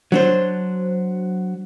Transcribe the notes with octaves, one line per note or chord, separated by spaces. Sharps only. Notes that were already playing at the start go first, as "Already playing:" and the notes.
F#3 D4 C5